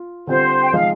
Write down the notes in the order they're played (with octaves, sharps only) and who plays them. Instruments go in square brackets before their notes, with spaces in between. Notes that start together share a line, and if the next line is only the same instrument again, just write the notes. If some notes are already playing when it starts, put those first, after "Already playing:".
Already playing: [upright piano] F4
[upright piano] D3 G3 C4 F4 [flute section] C5
[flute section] G5
[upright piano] C3 F3 G#3 C4 D#4 [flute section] F5